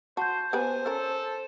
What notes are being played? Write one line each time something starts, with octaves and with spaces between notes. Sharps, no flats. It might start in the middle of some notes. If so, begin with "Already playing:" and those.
F#4 C5 A5 G6
B3 G4 B4 C5 G#5
C#4 A4 A#4